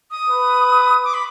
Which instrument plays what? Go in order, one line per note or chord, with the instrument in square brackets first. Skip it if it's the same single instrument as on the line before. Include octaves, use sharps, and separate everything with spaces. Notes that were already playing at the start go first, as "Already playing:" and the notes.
[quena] D#6
[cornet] B4
[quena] D6
B5